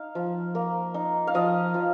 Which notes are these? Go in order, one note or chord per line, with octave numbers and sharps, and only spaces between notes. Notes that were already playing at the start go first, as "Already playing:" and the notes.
Already playing: D#4 F5
F3
A#3
D#4
F5
F3 D#5
F3